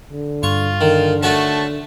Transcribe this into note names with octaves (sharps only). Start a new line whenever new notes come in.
D3
G2 F4 C#6
D3 D#3
A3 F#4 C#5 A5